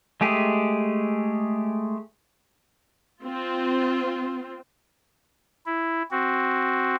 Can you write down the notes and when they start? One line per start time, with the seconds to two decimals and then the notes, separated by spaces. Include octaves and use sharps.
0.21 G#3 A3 G4 G#4
3.23 C4 F4
5.66 E4
6.11 C4 F#4